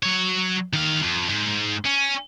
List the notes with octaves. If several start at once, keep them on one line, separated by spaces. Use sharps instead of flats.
F#3 C#5
D#3 F5
F2
G#2
C#4